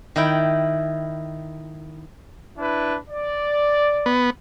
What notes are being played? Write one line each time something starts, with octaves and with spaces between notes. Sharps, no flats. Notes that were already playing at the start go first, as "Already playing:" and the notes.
D#3 E4 G5
D4 E4 B4
D5
B3